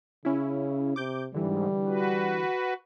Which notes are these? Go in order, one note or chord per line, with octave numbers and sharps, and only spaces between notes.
C#3 C#4 E4
C3 D6 G6
G#2 D3 E3 G3
F#4 B4